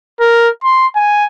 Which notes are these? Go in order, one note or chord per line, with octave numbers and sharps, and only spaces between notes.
A#4
C6
G#5